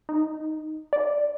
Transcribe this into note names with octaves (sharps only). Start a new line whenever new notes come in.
D#4
D5